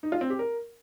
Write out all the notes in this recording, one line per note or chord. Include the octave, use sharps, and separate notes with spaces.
D#4
F4
C4
G4
A#4